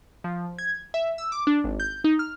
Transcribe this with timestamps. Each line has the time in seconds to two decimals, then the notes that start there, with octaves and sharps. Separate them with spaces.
0.24 F3
0.59 G#6
0.94 E5
1.18 E6
1.32 D6
1.47 D4
1.64 G#1
1.80 G6
2.04 D#4
2.19 F6